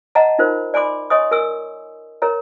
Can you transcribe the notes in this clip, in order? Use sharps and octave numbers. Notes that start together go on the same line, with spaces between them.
D#5 F#5 A5 A#5
D#4 F4 A#4 C5
D5 G#5 B5 C6 D6
C#5 D#5 G#5 C6 C#6 D#6
A#4 G#5 E6
A#4 C#5 A#5